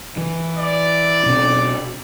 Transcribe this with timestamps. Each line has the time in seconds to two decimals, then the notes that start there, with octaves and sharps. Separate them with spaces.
0.17 E3
0.57 D5
1.26 B2 C4 D4